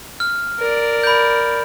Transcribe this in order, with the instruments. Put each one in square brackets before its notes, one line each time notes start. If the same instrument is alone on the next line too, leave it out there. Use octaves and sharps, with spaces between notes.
[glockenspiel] F6
[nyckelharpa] A#4 D5
[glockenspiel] B5 G6